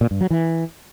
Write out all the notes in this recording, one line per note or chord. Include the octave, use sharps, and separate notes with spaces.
A#2
G2
F#3
E3